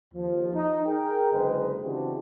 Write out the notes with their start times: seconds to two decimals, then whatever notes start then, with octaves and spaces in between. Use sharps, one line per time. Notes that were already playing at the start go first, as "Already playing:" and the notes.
0.14 D#2 F3
0.54 D#4
0.86 G#4 A#4 G5
1.32 F#1 D3 G#3 B4 C5 D#5
1.82 C#3 E3 C4 D4 F#4 G4